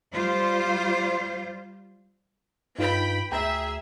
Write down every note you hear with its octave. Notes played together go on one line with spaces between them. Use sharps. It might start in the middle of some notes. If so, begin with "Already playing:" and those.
G3 F4 C5
G2 D#4 F4 B4 G5 B5
D2 G#4 E5 G5 A#5